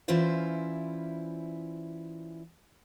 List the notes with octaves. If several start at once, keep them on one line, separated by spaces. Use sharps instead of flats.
E3 C#4 E4 F4 C5 D5